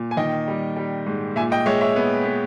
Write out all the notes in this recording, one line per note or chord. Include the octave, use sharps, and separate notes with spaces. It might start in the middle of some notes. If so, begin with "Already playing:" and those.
Already playing: A#2
G#5
D#3 D#5 G5
G3
G3
G#2
A#2 E5 G#5
D#5 G5
G#3 C#5 E5
C#5 E5
B3
B3